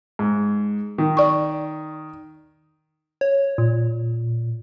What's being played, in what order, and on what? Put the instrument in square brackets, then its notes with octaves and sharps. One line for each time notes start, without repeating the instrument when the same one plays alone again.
[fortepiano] G#2
D#3
[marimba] D5 C#6
[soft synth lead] C#5
A#2